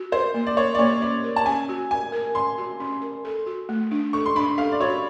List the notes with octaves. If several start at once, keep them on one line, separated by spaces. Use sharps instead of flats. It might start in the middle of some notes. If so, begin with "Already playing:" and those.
Already playing: F#4
A#4 C5
A#3
D5
A#4 C#5
D5
A#3 C#5
C#4 D5
A#4
A5
C#4 G#5
F#4
A#4 G#5
A#4
A#4 C6
F#4
C#4
A#4
A4
F#4
A3
D4
A4 C#6
C6
D4 B5
A4 F5
D5
F#4 C#5